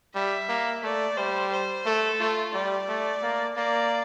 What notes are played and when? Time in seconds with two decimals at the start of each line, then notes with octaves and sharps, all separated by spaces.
0.15 G3 E5
0.49 A#3
0.84 A3 D5
1.17 G3 C5
1.52 C5
1.86 A3 A4
2.20 A3 F4
2.54 G3 D5
2.89 A3
3.23 A#3
3.57 A#3 D5